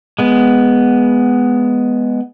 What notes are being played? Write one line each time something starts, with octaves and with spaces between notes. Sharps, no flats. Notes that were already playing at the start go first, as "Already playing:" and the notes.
G#3 B3